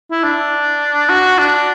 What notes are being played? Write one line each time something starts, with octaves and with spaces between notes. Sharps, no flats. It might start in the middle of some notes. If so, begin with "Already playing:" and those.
E4
D4
F#4
D4